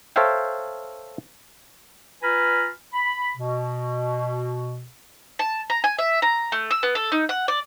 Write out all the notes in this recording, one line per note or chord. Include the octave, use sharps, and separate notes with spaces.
A4 C5 C#5 E5 F5 G5
F4 B4 G#5 A#5 B5 F6
B5
B2
A5
A#5
G#5
E5
A#5
A3
E6
B3
A4
D#4
F#5
D5